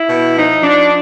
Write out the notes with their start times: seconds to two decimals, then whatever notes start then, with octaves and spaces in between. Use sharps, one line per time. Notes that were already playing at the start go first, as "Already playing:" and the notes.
Already playing: E4
0.08 B2
0.36 F3 D#4
0.63 F3 D4